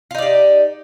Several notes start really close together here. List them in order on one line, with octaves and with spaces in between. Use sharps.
F4 D#4 D5 G4